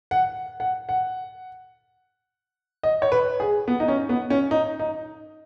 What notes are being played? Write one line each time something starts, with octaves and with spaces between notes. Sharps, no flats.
F#5
F#5
F#5
D#5
C#5
B4
G#4
B3
D#4
C#4
B3
C#4
D#4
D#4